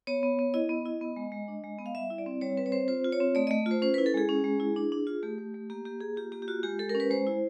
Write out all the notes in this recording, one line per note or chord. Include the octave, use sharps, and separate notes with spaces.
B3 C#5
B3
B3
E4 D#5
B3
E4
B3
G#3
G#3
D4
G#3
B3
F5
G3 E5
E4
D5
C4
G3 C#5
C4 B4
C#5
C4 C5
F4 C5
F4
C#5
C4
A3 D5
A3 D#5
F4 C5
C#4 C5
E4 B4
A4
G#3 G#4
C#4
G#3
E4
D4
D4
F4
A3 G4
A3
A3
A#3 G4
A#3 G4
A#3 G#4
F4 G4
A#3 G4
G4
F4 F#4
G#3 G4
G#3 A4
C#4 A#4
B4
G#3 C5
E4